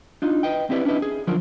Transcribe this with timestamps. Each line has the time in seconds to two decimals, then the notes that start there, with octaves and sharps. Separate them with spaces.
0.22 D4 D#4 F4
0.43 B4 D#5 G5
0.70 C4 E4 G4 B4 D5
0.85 C#4 D4 E4 B4 D#5
1.02 G#4
1.27 D3 F3 F#3 D4 F4 A#4